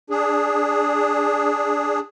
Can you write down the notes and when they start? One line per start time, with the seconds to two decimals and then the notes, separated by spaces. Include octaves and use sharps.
0.10 D4 G#4